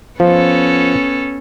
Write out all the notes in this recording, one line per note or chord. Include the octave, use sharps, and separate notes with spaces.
F3 B3 C#4 A4